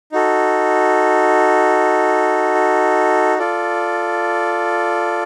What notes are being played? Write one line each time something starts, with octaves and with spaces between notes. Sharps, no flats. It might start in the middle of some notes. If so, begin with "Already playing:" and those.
D#4 F#4 A4
F4 A4 D5